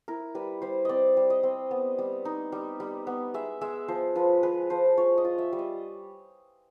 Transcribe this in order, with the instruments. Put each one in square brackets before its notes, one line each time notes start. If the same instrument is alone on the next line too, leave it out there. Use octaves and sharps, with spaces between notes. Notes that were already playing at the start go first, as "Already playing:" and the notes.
[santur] E4 A#4
G3 B4
G3 C5
C4 D5 D#5
G3
D#5
C4
B3
G3
D#4
G3
G3
B3
G#3 E5
G#3 E5
F3 C5
F3 B4
G#3 B4
F3 C5
F4 C#5
D#5
F4
E5
G3
D#5